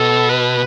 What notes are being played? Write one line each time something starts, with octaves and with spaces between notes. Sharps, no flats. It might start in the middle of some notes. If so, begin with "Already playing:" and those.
Already playing: B2 A4
B4